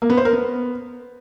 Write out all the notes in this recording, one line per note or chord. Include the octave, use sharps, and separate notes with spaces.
A#3
B3
C5
A#4
B3